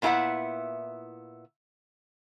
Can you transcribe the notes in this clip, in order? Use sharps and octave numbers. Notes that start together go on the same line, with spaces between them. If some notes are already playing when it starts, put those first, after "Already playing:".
A#2 B3 E4 G4 E5 F#5